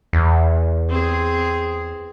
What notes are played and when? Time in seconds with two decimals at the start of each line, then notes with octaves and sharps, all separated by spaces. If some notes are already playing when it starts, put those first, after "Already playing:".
0.13 E2
0.89 C4 G#4